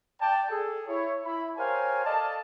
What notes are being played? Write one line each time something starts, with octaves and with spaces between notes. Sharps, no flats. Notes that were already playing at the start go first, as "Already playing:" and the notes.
D5 G5 A5
G#4 A4
E4 C#5
E4 B5
G4 A#4 C5 C#5 F5 G#5
A4 D5 D#5 F5 A5